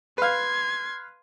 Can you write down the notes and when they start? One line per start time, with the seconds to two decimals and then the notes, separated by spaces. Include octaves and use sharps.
0.18 B4 F5 C6 G#6